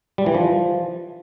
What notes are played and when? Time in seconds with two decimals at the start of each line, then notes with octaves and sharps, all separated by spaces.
0.18 G3
0.26 E3
0.35 F3